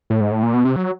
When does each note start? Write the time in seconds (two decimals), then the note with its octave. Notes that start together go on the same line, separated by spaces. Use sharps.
0.10 A2
0.21 G#2
0.32 A2
0.43 A#2
0.54 B2
0.65 C3
0.76 F#3